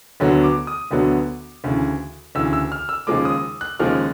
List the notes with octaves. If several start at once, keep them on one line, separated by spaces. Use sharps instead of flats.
D2 D3 F#3 B3
D6
D#6
D2 D3 F#3 B3
D2 C#3 E3
D2 C#3 E3 E6
E6
F6
E6
D#2 C#3 F3 G#3 D6
D#6
F#6
D#2 C#3 F3 G#3 F6